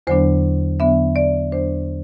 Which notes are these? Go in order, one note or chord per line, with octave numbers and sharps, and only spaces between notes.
E2 D3 F#3 B3 D4 C5
E2 D3 F#3 B3 D4 E5
D5
E2 D3 F#3 B3 D4 C5